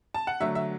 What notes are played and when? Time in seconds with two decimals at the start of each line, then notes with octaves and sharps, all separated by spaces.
0.14 A5
0.27 F#5
0.41 D3 F#3 A3 E5
0.55 E5